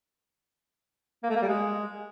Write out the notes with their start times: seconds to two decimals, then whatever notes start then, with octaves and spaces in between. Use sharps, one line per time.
1.23 A#3
1.30 A3
1.36 A#3
1.42 G3
1.48 G#3